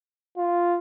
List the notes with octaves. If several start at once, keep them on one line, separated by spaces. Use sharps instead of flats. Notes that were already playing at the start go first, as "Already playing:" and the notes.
F4